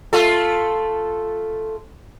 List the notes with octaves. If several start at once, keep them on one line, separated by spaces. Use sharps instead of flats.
A3 F4 A4